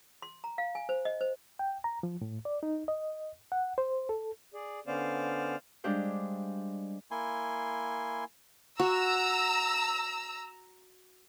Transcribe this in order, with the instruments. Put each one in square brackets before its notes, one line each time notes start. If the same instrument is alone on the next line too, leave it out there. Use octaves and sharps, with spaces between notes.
[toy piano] C6
A#5
F5
G#5
C5
D#5
C5
[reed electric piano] G5
A#5
F3
A2
D5
D#4
D#5
F#5
C5
A4
[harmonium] G#4 D5
[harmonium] D3 B3 C#4 [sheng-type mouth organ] C5 D5 F5
[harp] G3 G#3 D4 G4 C5 F5
[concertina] A#3 E4 G#5 C6
[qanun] F#4 [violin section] A#5 E6